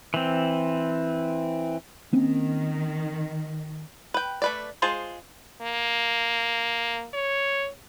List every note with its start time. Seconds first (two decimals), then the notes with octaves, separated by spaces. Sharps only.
0.14 E3 C4
2.13 D#3 A#3 C4 C#4
4.14 B4 G5
4.42 A3 B4 D5
4.82 G#3 F4 G#4 C5 A5
5.62 A#3
7.14 C#5